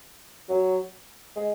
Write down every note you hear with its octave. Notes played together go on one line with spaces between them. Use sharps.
F#3
G#3